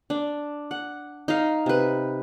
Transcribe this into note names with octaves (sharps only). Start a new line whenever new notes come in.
D4
F#5
D#4 F5
C3 B4